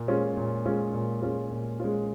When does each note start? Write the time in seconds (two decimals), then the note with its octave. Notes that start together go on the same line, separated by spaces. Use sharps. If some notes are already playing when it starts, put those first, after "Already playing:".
Already playing: A#2
0.08 G#3 C#4 F4
0.37 A#2
0.65 G#3 C#4 F4
0.93 A#2
1.22 G#3 C#4 F4
1.51 A#2
1.80 G#3 C#4 F4